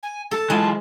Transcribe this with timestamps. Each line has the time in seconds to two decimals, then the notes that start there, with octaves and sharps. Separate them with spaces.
0.03 G#5
0.31 A4 A5
0.50 E3 G#3 F4